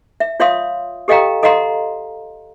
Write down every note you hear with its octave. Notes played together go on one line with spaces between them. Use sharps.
E5
F4 C#5 E5 F5 C6 D#6
G4 A4 D#5 F5 G5 A#5
A4 D#5 F5 F#5 A#5 C6